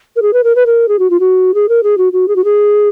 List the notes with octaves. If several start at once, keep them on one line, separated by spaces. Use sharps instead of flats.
A#4
G#4
B4
A#4
B4
A#4
G#4
F#4
F4
F#4
G#4
A#4
G#4
F#4
F#4
G#4
F#4
G#4